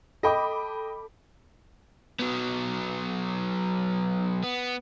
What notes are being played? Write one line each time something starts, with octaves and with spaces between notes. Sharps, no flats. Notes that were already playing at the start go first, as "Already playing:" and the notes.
A4 D#5 G5 B5 D6
F#3 B3
B3